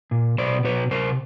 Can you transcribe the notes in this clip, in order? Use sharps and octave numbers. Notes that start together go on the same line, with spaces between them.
A#2
B2 C5 D5
B2 B4 C#5
C3 A#4 C5